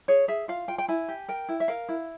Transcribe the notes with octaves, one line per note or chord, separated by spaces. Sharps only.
G#4 C#5
G#4 E5
F4 F5
F4 G5
G5
E4 G#5
G4
A#4 G5
E4
E5
A#4 F5
E4